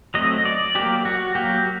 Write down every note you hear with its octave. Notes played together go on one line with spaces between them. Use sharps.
F#3 A3 C4 D#5
D5
F#3 A#3 G4
F#4
F#3 A#3 G4